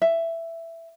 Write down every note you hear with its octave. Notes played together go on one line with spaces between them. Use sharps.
E5